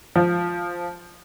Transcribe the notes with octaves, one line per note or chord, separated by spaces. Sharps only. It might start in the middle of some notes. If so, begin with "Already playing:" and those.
F3